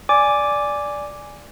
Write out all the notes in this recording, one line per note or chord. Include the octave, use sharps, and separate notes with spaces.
D5 G#5 D6